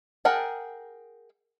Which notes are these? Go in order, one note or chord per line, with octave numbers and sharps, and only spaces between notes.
G#4 A#4 F#5 G5 A5